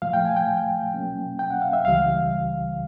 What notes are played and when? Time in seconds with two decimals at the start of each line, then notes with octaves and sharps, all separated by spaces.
0.02 A#2 F3 A3 F5
0.13 G5
0.25 G#5
0.37 G5
0.94 B2 F#3 A#3 C#4
1.39 G5
1.50 F#5
1.62 F5
1.73 E5
1.84 C#2 C#3 E3 G3 F5